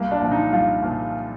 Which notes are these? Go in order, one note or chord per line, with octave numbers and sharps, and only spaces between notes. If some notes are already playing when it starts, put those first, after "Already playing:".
Already playing: C2 A#3
D4
A#2 F3
D#4
C2 F4
A#2 F3